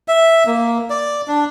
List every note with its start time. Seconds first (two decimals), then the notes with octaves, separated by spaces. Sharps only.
0.08 E5
0.46 A#3
0.90 D5
1.28 D4